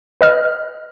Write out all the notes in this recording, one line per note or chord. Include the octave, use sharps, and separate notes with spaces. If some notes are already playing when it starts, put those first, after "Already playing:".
B4 D#5 F6